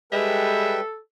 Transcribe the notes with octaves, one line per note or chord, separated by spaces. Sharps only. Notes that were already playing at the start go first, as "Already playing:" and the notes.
G3 G#3 A4 B4 E5 G5